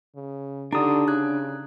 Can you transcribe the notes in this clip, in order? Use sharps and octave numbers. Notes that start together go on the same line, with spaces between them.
C#3
D3 D4 D#4 G4 A#5 D#6
C#3 F#6 G#6